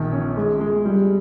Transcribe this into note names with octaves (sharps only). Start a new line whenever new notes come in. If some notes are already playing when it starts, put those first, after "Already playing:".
Already playing: A#1 D#3
C#4
G#3
G#3
G3